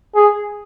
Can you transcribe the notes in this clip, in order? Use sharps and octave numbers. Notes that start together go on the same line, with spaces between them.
G#4